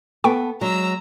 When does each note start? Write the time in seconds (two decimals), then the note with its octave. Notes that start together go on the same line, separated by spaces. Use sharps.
0.24 B3 A4 G5 C#6
0.61 F#3 G#3 A#5 E6